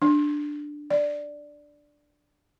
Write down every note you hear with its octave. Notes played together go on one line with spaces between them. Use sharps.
D4
D5